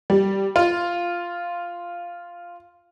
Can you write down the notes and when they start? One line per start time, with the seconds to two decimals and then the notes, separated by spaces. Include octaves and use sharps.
0.10 G3
0.56 F4